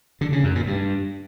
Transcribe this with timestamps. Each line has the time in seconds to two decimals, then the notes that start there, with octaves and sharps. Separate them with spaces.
0.21 D3
0.32 C#3
0.44 F#2
0.55 A#2
0.67 G2